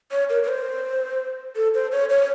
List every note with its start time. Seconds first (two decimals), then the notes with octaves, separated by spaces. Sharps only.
0.12 C#5
0.30 A#4
0.43 A#4
0.48 C5
1.56 A4
1.74 C5
1.92 C#5
2.10 C#5